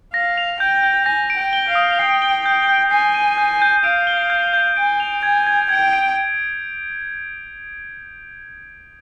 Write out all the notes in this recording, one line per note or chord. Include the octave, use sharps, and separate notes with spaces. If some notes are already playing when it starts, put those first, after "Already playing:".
F5 A#6
F7
G5 G6
G6
G#5 A#6
D7
G5
G7
F5
D#6
G5 C7
G7
G6
G6
G#5 C7
D#7
G6
G6
F5 D7
G7
G6
G6
G#5 D7
F7
G#5 G#6
G#6
G5 G#6
D7